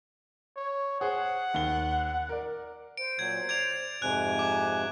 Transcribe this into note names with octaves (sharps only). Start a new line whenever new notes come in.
C#5
G#4 C5 F#5
D#2 G7
A#4 D5
C5 D7
A#2 F#3 G#6
D5 G#6 D7 F7
F2 G#2 C3 G#5 F#6
D6